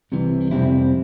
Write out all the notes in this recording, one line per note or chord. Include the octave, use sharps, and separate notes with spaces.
C2 C3 E3
F2 C3 G3 C4 E4